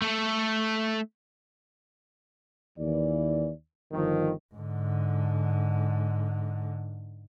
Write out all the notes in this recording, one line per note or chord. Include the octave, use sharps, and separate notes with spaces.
A3 A4
D#2 E3 D5
G1 D#3 F3
G#2 D3